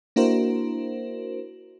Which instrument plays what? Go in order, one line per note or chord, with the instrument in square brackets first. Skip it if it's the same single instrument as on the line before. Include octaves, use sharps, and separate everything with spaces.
[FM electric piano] A#3 D4 E4 F#4 A#4 C5